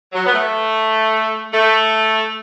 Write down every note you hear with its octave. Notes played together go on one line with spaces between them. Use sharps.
F#3
B3
A3
A3